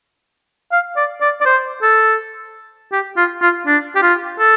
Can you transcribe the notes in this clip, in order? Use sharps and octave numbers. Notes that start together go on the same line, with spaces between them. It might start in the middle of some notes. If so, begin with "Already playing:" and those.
F5
D5
D5
D5
C5
A4
G4
F4
F4
D4
G4
F4
A4